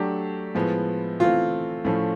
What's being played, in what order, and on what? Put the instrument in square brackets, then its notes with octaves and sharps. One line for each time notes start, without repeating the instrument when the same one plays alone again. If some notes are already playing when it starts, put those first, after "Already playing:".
Already playing: [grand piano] F#3 A3 D4 G4
A2 F3 G#3 B3
[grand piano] E3 A3 C4 [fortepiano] F4
[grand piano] A2 F3 A3 C#4